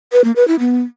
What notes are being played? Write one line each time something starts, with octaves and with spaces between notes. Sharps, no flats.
B4
A#3
B4
E4
B3